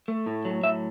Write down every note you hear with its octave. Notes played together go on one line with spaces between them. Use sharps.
A3
A2
F#3
A2 E5